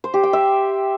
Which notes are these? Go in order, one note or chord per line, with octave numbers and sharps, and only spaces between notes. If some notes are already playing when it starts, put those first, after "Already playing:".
C5
G4
G5
E5